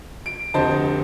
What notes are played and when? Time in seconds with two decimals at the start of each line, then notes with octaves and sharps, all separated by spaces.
0.26 D7
0.54 F1 D2 C5 D#5 A5